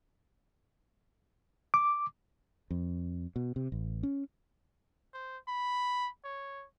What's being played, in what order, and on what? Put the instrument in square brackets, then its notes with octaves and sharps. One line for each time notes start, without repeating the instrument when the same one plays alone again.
[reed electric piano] D6
[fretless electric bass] F2
B2
C3
A1
C#4
[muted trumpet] C5
B5
C#5